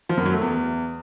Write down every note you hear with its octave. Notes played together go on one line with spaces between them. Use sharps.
F3
F#2
F#3
A3
E2